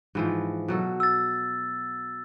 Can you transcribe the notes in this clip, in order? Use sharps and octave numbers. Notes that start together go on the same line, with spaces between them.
G#2 E3 F3
B2 F#3 A4
E6 A6